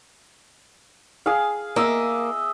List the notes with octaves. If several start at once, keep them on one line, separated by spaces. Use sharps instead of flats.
G#4 F5
A#3 D#5 E5